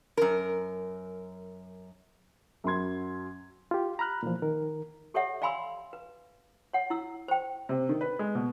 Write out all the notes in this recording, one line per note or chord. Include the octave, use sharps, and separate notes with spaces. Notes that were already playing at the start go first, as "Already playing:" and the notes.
F#2 A#4
F#2 F#3 C6 G#6
F4 G4
A#5 B5 F6 F#6
A#2 E3 F3
D#3 A#4
G4 A4 C#5 D5 E5 F#5
D5 F5 G#5 B5 C6 E6
B4
C#5 F#5
E4 E6
C5 G5
C3
D#3
B4
G#3
B2